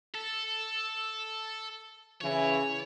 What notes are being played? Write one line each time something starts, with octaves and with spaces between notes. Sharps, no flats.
A4
C#3 E3 C#5